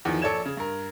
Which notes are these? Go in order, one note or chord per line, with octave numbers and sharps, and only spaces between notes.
E2 D#3 F3
A#1 A4 C#5 D5 G#6 E7
C#3
G2 A#4